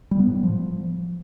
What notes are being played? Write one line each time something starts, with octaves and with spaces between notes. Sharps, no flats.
G3
B3
A2
G3
F3